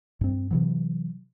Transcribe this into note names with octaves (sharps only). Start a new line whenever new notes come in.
G2 C4
C3 E3 F#3